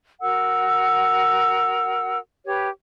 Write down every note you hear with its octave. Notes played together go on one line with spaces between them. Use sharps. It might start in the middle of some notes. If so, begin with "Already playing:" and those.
F#4 A#4 F#5 E6
G4 B4 C#5